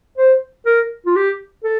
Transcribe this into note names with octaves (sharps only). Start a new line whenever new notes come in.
C5
A#4
F4
G4
A4